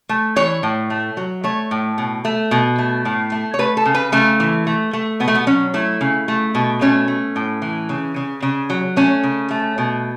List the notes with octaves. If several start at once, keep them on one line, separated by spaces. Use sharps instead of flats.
A3
E3 C#5
A2
A3
F#3
A3 C#5
A2
B2
A3
B2
A3
A2
A3
C#5
A3 B4
A4
C#3
B4
C#3 A3
E3
A3
A3
B2 B3
A3
B3
F#3 C#4
A3 E4
C#3
A3
B2
A3 C#4
A3
A2
E3
C#3
C#3
C#3
F#3
A3 C#4
C#3
A3
B2